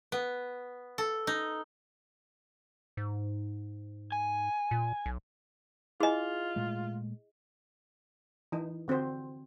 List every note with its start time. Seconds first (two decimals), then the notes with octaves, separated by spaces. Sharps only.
0.12 B3
0.98 A4
1.27 D#4
2.97 G#2
4.12 G#5
4.71 A#2
5.06 B1
6.00 E4 F4 G#4 D#5 G#5
6.56 A#2 G#3 A3
8.52 E3 D#4
8.88 D3 C4 F#4 C5